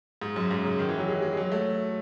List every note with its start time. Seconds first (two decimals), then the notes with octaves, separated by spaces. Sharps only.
0.22 G#2
0.36 F#2
0.51 G#2
0.64 C#3
0.79 D#3
0.89 E3
0.98 F#3
1.08 G#3
1.22 G#3
1.33 G#3
1.37 F#3
1.52 A3